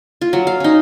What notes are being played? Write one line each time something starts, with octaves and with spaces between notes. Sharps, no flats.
F4
F#3
F5
C#4 D#4